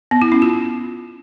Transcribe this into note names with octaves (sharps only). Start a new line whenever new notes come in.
B3
E4
C#4
F4